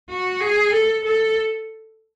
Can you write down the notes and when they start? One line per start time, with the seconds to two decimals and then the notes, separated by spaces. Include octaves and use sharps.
0.09 F#4
0.41 G#4
0.73 A4
1.04 A4